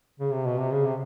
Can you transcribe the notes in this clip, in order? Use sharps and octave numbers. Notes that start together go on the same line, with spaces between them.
C#3
C3
B2
C3
C#3
C3